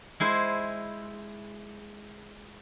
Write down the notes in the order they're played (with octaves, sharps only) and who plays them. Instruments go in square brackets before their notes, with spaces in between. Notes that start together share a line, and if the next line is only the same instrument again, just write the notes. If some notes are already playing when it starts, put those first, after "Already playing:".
[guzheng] G#3 E4 C5